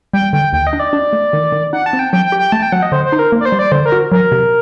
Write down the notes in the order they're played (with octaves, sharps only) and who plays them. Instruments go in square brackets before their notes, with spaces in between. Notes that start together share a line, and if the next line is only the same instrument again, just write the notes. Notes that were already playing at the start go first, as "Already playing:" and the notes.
[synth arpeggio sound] G3 [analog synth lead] G5
[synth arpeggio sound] D3 [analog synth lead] G5
[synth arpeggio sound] D#2 [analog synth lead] G5
[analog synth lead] D#5
[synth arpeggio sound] D4
[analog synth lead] D5
[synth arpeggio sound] D4
A3
D#3
D#3
[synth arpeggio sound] D#4 [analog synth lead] F#5
[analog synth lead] A5
[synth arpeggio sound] C4
[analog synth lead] G5
[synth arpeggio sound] F#3 [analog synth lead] G5
[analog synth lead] G5
[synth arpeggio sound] G4
[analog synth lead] G5
[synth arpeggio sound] A3 [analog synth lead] A5
[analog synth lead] G5
[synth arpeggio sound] F#3 [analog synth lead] F#5
[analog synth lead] D#5
[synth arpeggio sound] D3 [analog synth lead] C5
[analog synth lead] C5
[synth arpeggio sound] D#4
[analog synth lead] A#4
[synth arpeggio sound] A#3
[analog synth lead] D5
C5
[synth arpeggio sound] G3
[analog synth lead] D5
[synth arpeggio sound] D3 [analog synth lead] C5
[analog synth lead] A#4
[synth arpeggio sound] F#4
[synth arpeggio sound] F#3 [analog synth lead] A#4
[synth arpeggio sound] C3